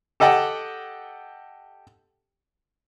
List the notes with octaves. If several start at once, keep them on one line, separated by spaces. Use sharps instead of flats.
G4 A4 D#5 F#5 G5